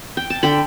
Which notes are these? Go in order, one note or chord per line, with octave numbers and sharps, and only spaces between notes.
G5
A5
D3 G5 B5